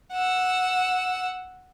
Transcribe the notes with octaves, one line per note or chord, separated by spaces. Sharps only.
F#5 E6